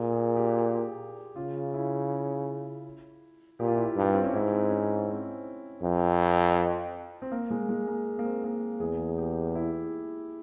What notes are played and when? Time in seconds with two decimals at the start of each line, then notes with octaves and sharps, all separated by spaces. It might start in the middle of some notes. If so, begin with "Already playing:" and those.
Already playing: A#2 G#4
0.12 G#4
0.36 G4
1.36 C#3 F4
1.74 E4
3.60 A#2 G4
3.67 F4
3.76 E4
3.84 F4
3.96 G2
4.14 C4
4.24 C#4
4.34 G#2 E4
4.52 C4
4.71 C#4
5.08 C4
5.83 F2
7.22 C4
7.32 A#3
7.51 G#3
7.69 G#3
7.88 A#3
8.19 A#3
8.24 C4
8.44 A#3
8.80 E2 G#4
9.09 G#4
9.18 G4
9.55 E4